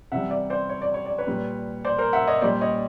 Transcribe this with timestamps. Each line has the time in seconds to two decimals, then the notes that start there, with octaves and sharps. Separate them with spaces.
0.12 C3 E3 G3 E5 F#5
0.31 D5 E5
0.50 C5 D5
0.69 C#5
0.82 D5
0.94 C#5
1.06 D5
1.18 B4 C#5
1.27 A#2 G3
1.85 C5 D5
1.98 A#4 C5
2.13 E5 F#5
2.27 C#5 D#5
2.42 A#2 G3 C5 D5
2.61 C#5 D#5